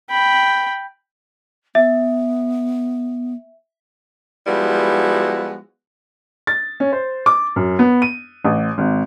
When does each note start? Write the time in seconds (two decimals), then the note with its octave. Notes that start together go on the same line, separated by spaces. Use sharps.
0.10 G5 B5
1.75 B3 E5
4.47 F3 G3 G#3 B3 E4 F#4
6.47 A6
6.80 C#4
6.92 C5
7.26 D6
7.56 F#2
7.79 B3
8.02 D#7
8.44 A1
8.78 G#1